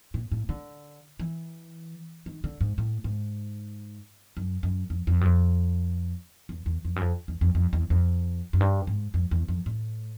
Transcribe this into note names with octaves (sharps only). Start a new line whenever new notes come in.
A#2
A2
D3
E3
D#3
D3
G#2
A2
G#2
F#2
F#2
F2
F2
F#2
F2
E2
E2
F2
F#2
F2
E2
F2
F2
E2
F2
F#2
G2
G#2
F2
E2
F2
A2